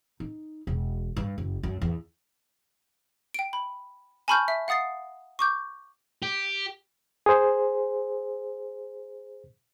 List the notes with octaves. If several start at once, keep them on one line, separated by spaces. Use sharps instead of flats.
D#4
E1
G2
F#1
F#2
E2
G5 D7
B5
G#5 A5 B5 C#6 F6 G6
E5
F5 F#5 D#6 A6 C7
C#6 D6 G6
G4
G#4 C5